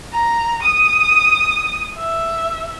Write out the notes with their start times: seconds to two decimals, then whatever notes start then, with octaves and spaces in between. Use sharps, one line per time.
0.12 A#5
0.62 D#6
1.98 E5